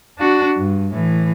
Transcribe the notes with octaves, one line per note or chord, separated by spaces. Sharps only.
D4 F#4
G2
A2 E3